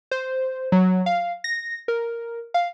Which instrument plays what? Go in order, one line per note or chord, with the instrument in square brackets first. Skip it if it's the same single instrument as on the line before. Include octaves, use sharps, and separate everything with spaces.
[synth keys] C5
F#3
F5
A#6
A#4
F5